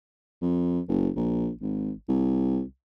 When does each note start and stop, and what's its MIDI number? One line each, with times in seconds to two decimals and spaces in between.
0.42 0.80 41
0.88 1.10 30
1.16 1.50 34
1.62 1.91 32
2.09 2.62 36